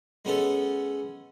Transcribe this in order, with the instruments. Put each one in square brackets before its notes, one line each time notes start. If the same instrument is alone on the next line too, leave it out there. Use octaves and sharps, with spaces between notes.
[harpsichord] G#3 B3 C#4 A4